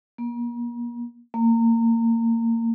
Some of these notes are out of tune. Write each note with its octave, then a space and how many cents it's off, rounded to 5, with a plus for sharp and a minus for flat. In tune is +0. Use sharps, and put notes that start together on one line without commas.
A#3 +40
A#3 -25